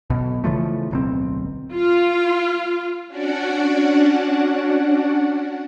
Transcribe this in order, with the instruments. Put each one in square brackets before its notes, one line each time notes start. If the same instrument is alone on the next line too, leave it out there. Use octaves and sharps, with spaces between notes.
[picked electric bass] B1 B2
C#3 E3 F3 A3
D1 B1 C4
[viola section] F4
[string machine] C#4 D4 F#4 D5 F#5